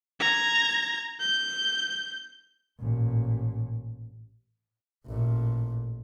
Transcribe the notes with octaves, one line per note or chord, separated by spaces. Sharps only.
A#5 G#6
G6
A1 A#2
A1 A#2